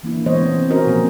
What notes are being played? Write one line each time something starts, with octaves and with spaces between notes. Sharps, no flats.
E3 A#3 D4 E4
E3 G#3 B3 C5 C#5 D#5
C4
C#4 E4 F#4 A#4 C5 D#5
B2 F3 A#3 C4